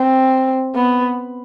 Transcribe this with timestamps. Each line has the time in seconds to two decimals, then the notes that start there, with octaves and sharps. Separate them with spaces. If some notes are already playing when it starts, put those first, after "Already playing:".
Already playing: C4
0.75 B3